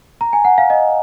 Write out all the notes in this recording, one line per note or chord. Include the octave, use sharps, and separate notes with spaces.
A#5
G#5
F#5
F5
D#5